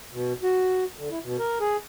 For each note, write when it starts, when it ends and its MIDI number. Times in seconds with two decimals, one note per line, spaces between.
0.13 0.33 47
0.43 0.84 66
0.98 1.09 50
1.11 1.19 64
1.23 1.37 47
1.38 1.59 70
1.60 1.76 68